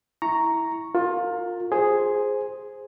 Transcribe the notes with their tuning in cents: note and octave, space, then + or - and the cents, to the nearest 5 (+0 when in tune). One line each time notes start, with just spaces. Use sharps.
E4 -5 A#5 +0 C#6 +0
F4 +20 A#4 -30
G#4 +0 C5 +0